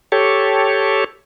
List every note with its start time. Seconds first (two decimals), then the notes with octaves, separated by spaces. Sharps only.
0.12 G4 A4 C#5